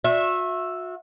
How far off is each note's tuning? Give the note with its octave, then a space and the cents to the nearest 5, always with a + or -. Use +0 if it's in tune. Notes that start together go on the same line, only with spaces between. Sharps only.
F#4 -35 E5 +0